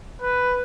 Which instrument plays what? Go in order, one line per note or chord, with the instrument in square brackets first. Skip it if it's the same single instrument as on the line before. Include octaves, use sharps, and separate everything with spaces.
[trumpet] B4